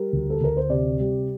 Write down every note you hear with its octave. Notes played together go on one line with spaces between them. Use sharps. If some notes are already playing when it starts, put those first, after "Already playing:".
Already playing: G3 A#4
D2
A4
D2 A#4
C5
C3 D5
G3